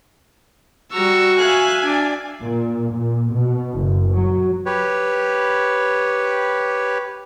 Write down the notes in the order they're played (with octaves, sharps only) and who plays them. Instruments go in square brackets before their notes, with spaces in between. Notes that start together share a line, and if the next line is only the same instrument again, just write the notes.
[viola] G3 A#5 [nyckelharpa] F#4 C#6 [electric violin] E6
[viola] E5 F5 [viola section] G#5 [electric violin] F#6
[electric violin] D4 [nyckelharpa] D5
[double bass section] A#2
A#2
B2
F#1
F#3
[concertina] G4 B4 C#5